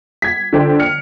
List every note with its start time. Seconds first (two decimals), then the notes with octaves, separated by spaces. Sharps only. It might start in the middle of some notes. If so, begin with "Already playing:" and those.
0.22 G#6 B6
0.53 D3 F3 C5 D5 G5
0.79 F6 C#7